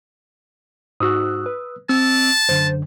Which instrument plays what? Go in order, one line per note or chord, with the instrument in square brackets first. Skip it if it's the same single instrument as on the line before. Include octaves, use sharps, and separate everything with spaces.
[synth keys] G#2 F#4 F#6 [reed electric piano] D#6 E6
[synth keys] B4
[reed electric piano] C4 [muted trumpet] A5 [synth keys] E6
[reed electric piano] F#2 D3 [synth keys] C5